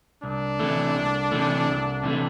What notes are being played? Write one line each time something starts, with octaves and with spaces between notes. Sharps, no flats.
C2 D4
C3 E3 A3
C2
C3 E3 A3
C2
C3 E3 A3